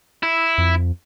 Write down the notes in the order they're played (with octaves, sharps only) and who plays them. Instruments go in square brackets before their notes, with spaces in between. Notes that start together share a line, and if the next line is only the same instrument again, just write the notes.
[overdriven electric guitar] E4
[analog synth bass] F2